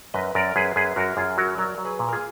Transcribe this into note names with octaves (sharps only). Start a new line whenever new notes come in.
F#2 B4 D#5
F#2 A#4 D5
F#2 G#4 B4
F#2 G#4 B4
F#2 F#4 A#4
F#2 F4 G#4
F#3 F#4 A#4
F#3 A#4 D5
F#3
G#4 B4
A#2
A#4
F4 G#4